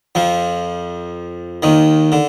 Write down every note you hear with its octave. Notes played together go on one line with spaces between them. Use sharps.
F2 F3
D#2 D#3
D3